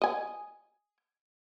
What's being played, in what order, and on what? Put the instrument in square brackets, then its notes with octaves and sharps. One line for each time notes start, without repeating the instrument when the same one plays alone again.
[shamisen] D#5 G#5